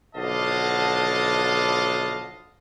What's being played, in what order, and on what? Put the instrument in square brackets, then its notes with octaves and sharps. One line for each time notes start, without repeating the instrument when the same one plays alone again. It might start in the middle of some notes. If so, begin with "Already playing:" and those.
[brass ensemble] B1 D3 F3 D#5 F5 A5